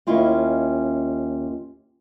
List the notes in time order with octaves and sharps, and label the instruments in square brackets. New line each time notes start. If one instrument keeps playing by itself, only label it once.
[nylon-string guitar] D#2 C#4 E4 F4 D#5